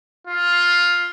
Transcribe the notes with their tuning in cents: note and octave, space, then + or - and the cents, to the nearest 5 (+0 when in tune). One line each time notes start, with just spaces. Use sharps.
F4 +5